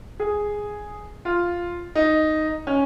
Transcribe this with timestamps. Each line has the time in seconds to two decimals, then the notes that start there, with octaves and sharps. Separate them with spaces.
0.20 G#4
1.25 F4
1.95 D#4
2.67 C#4